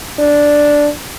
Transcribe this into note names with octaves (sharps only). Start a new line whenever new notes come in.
D4